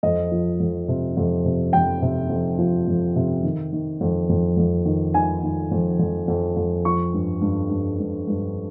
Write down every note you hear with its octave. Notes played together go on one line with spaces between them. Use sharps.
F2 D#5
F3
F2
C3
F2
C3
F2 G5
C3
F2
F3
F2
C3
D#3
D#3
F2
F2
F2
D#3
D#3 G#5
D#3
F2
F2
F2
F2
F3 C#6
G2
G2
G2
G2
G2